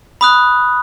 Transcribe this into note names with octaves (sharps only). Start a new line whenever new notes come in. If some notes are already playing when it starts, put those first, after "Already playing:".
B5 D#6 F#6